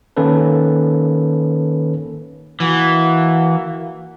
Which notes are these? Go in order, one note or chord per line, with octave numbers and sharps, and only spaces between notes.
D#3 A#3 C#4 A4 B4
E3 A#3 F#4